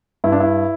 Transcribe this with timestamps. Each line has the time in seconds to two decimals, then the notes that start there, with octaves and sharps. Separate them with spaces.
0.24 G2 E4
0.32 D4
0.40 E4